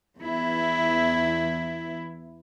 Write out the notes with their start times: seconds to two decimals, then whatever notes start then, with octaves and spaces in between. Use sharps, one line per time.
0.17 E2 E4